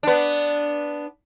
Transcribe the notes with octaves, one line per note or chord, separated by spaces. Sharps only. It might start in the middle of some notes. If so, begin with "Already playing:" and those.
B3 D4